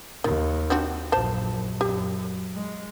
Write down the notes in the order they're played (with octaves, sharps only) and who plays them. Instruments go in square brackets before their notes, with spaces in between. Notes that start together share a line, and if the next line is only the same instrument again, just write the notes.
[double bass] D#2 [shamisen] D#3
[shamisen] C4 D4 F#4
[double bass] A#1 F#2 [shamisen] C5 A5
[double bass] F#2 [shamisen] G4
[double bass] G#3